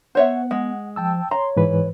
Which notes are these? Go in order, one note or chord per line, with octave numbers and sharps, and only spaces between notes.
B3 C5 C#5 E5 F#5
G#3
F3 G5 A5 E6
C#5 A#5 C6
G#2 E3 B4